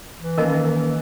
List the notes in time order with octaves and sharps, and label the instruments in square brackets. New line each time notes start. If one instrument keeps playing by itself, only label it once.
[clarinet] E3
[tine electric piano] D#3 A#3 C#4 [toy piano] A#4 D#5 A5